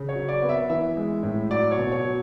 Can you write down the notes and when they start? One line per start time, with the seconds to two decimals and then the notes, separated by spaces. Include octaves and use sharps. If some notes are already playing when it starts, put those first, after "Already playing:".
Already playing: C#3
0.09 C#5
0.15 F#3
0.29 D5
0.42 B3
0.49 E5
0.69 E3 E5
0.97 G#3
1.23 A2
1.51 F#3 D5
1.71 C#5
1.77 B2
1.92 C#5
2.05 F#3